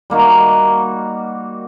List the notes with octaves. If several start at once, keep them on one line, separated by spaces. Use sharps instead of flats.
G3 A#3 D#4 F#4